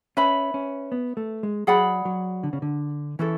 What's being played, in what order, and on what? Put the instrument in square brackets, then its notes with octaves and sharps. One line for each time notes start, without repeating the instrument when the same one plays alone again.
[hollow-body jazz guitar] C#4 [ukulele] B4 E5 B5
[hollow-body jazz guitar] C#4
B3
A3
G#3
[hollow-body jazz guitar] F#3 [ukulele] G#4 D5 F#5 B5
[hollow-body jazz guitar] F#3
D3
C#3
D3
[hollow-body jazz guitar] E3 [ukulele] C#4 E4 A4